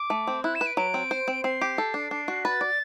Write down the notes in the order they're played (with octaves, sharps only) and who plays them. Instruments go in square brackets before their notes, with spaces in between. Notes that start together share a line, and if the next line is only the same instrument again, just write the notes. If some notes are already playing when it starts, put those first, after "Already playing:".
Already playing: [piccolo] D6
[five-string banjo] A3
C4
[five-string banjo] E4 [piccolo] F#6
[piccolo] E7
[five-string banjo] B4
[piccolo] D7
[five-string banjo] F#3 [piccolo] D7
[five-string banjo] C4
C5
C4
[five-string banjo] C4 [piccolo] C7
[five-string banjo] G4
A4
D4
D4
F#4
[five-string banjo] B4 [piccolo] A6
[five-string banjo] D5